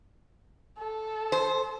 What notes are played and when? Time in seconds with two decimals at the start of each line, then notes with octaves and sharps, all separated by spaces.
0.78 A4
1.32 C5